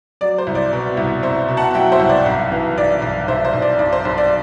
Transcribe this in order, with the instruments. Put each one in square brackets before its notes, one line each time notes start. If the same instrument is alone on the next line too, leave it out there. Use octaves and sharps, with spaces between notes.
[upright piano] F#3 D5
C5
C2
D5
B2
C2
C2 C5 E5
B2
F#5 A5
F#3 E5 G5
C5 E5
C2
D5
B1
E3
B1 D5
B1
B1 C5 E5
C5
B1
D5
B1 D5
C5
B1 C5
D5